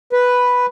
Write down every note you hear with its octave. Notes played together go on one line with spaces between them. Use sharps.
B4